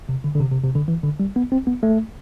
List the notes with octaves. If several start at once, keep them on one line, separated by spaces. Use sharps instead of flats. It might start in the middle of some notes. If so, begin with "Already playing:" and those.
C3
D3
D3
C3
C3
C3
D3
E3
D3
G3
B3
C4
B3
A3